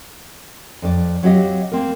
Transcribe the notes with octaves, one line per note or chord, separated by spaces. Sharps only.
F2 D5
F#3 C4 G4 D#5 F5
A#3 C4 A#4